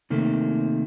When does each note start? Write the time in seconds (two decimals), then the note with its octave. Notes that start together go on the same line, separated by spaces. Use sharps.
0.10 C3 D#3 A3 A#3